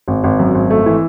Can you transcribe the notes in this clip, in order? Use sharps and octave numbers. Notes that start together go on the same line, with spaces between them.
G#1
G#1
F#2
G#1
A3
E3